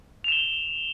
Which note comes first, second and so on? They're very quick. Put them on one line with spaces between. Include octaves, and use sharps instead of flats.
F7 E7 G7